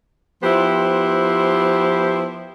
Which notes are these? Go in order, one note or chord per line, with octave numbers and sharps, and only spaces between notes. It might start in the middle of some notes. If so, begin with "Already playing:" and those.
F3 B3 E4 G4 C5